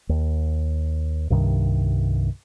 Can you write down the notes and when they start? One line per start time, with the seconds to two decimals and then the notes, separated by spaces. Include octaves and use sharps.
0.09 D#2
1.30 C2 G2 C3 D#3